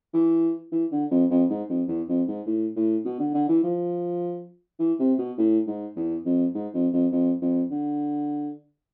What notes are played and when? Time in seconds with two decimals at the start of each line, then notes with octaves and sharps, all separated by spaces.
0.14 E3
0.72 E3
0.92 D3
1.11 F2
1.31 F2
1.49 G#2
1.70 F2
1.88 E2
2.09 F2
2.28 G#2
2.47 A2
2.76 A2
3.05 B2
3.19 D3
3.34 D3
3.49 E3
3.64 F3
4.79 E3
5.00 C3
5.19 B2
5.38 A2
5.67 G#2
5.96 E2
6.25 F2
6.55 G#2
6.74 F2
6.93 F2
7.12 F2
7.42 F2
7.71 D3